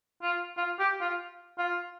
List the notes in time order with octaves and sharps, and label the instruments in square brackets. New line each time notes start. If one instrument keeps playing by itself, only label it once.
[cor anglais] F4
F4
G4
F4
F4